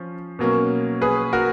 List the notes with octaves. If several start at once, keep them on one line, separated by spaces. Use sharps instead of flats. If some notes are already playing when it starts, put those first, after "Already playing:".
Already playing: F3 C#4
B2 F#3 A#3 C#4
G#4 B4
F#4 A#4